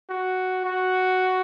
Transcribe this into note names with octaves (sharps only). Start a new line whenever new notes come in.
F#4
F#4